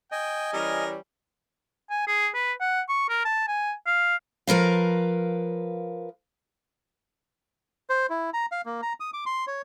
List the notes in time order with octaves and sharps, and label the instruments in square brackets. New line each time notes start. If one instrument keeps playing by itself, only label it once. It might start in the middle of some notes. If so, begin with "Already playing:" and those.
[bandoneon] D#5 G#5 [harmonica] G5
[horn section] E3 G3 C#4 [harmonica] A#4
[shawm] G#5
G#4
B4
F#5
C#6
A#4
A5
G#5
F5
[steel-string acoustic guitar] F3 A#4 B4 F5
[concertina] C5
E4
A#5
F5
A#3
A#5
D#6
D6
C6
C#5